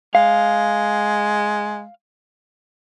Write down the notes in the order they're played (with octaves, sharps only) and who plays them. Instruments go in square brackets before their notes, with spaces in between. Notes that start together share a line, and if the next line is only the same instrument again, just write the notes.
[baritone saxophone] G#3 [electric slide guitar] F5